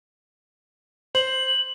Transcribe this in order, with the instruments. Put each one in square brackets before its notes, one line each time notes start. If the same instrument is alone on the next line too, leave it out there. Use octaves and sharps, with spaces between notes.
[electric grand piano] C5 [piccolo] F#7